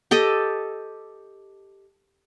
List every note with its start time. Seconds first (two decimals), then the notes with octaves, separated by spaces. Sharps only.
0.11 G4 A4 D#5